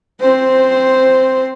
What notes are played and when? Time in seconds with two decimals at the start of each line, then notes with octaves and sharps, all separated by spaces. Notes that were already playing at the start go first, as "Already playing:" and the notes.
0.21 C4 C5